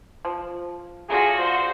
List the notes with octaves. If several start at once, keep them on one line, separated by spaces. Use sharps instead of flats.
F3
A3 D4 F4 F#4 G#4 A#6
C5